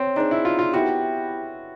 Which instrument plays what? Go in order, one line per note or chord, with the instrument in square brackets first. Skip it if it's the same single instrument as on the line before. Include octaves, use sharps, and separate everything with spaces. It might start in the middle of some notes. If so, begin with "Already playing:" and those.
Already playing: [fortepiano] C4 [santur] C#5
[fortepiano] D4 [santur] D#4 G#4 C5
[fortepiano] E4
F4
F4
[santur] B3 E4 G4 [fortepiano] F#4